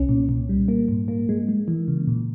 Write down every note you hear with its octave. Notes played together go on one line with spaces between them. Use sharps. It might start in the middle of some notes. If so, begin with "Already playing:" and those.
Already playing: C2 C#4
A#2
A#2
G3
A#3
G#2
A#3
G#3
G#3
E3
C#3
A#2